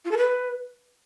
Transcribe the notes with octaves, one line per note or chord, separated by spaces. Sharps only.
F4
A4
B4